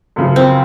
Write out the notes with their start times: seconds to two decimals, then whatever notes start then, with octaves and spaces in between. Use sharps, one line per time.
0.16 F#2 C#3 F3
0.36 C4